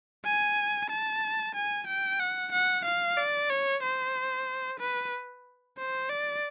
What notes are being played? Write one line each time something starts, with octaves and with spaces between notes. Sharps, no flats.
G#5
A5
G#5
G5
F#5
F#5
F5
D5
C#5
C5
B4
C5
D5